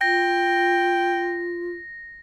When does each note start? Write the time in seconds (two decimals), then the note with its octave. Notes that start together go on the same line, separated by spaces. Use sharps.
0.01 F4 G5 A#6